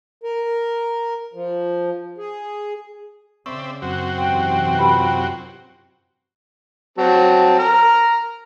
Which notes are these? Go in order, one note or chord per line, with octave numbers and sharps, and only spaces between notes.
A#4
F3
G#4
C#3 C4 D5 E5 C#6
F#2 C4 F#4
G#2 C3 E3 G5
F4 G4 B4
F#3 C4 A5
A#5 F6